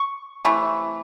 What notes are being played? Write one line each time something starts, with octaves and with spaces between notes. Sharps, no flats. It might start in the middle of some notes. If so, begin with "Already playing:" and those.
Already playing: C#6
C3 E3 A3